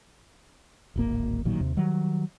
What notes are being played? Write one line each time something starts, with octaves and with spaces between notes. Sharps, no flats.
D1 G#1 A#3
A1 A#2 D#3 F#3
D#2 C3
D#3 F#3 G3